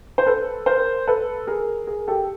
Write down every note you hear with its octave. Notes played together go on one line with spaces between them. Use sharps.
C5
A4 B4
A#4 C5
A4 B4
G#4 A#4
G#4 A#4
G4 A4